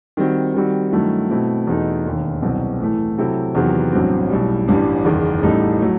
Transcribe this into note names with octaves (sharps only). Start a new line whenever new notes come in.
D#3 G3 C4 F#4
D#3 G3 C4 F#4
G2 D#3 F#3 A3 E4
B2 A3 C4 E4
E2 B2 A3 D#4 A4
E1 D#2 D#3
C2 B2 F#3 C4
A2 E3 A3
C3 F#3 C4 E4 A4
E2 C3 D#3 F#3 B3
A1 G2 F#3 C4
B1 A2 G3
A1 G2 E3 G3
F#1 E2 D#3
A1 A2 G3 D#4 A4
F#3 A3